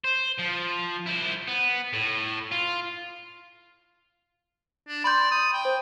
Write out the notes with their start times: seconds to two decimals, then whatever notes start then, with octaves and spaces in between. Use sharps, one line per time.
0.04 C5
0.38 F3
1.06 E4 C5
1.47 B3
1.93 A2
2.51 F4
4.88 D4
5.04 D5 B5 C6 G6
5.31 D#6
5.53 G5
5.65 C5